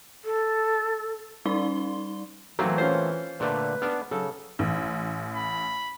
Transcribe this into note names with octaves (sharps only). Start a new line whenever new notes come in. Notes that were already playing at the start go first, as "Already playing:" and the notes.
A4
G3 C#4 D#4 D5 C6 G7
E3 F#3 A3 A#3 C4
C#4 F4 C5
A#2 D3 A3 B4
B3 D4 F6
C#3 F#3 A4
A1
B5